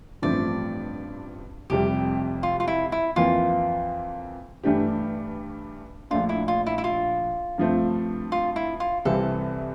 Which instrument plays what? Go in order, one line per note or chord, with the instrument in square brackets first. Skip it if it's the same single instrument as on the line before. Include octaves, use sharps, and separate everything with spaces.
[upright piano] A1 G2 F3 A3 C4 [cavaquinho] D5
[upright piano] F1 F2 C3 G3 [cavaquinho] G4
[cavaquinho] F4
F4
E4
E4
[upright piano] F2 E3 A#3 [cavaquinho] F4
[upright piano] G2 E3 A3 D4 G4
[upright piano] A#1 A#2 A3 D4 [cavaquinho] F4
[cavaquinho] E4
F4
E4
E4
F4
[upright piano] G2 F3 A3 C4
[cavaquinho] F4
E4
F4
[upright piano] C2 C3 E3 G3 C4 [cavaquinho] A4